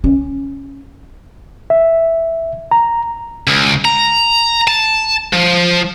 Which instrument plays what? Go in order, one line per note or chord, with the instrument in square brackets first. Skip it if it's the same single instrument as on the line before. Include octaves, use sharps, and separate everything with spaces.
[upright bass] C#4
[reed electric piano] E5
A#5
[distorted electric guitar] C#2
A#5
A5
F3